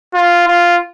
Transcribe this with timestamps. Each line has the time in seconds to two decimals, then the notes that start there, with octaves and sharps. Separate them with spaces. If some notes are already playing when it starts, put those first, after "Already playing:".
0.14 F4
0.47 F4